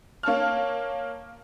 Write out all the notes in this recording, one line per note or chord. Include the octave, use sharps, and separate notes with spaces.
A#3 C#5 A5 F6